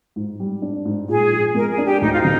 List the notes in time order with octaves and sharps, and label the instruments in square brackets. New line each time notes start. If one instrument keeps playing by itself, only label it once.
[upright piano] G#2
G3
D4
G#2
[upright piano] A#2 [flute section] G#4
[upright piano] F3
[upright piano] G#3 [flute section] A#4
[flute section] G#4
[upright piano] D4
[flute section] G4
[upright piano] D2 [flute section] D#4
[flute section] F4
[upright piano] D3 [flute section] D#4